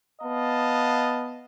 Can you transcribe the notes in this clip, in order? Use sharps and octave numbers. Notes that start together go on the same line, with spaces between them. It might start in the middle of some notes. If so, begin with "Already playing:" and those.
B3 D#5 F5 A5